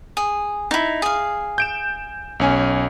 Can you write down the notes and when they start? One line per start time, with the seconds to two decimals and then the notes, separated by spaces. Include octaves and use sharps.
0.17 G#4
0.71 D#4 E4
1.02 G#4 F5
1.58 G6 D7 E7
2.40 B1 C#4 G#5